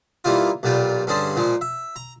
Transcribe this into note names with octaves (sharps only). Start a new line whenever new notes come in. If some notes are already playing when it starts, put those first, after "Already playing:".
E3 G3 A#3 D#4 F4
B1 A#2 G3 F4 G5
G2 D3 C#4 G#4 C5 A5
A#2 F3 G#3
E5
A#5